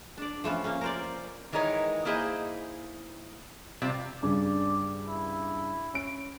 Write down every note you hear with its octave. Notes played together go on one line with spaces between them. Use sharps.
D4 D5
F3 A3 B3 C#4
A#3 C#4
A#4 C5 D5
D#3 E3 G#3 D#4 A#4 C#5
A#3 D#4 E4 G#4 C5 D#5
C3 G3 C4 F4
G2 C#3 D5
E4
C#4 D7